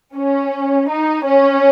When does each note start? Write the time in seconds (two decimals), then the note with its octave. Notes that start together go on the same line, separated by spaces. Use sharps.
0.16 C#4
0.89 D#4
1.25 C#4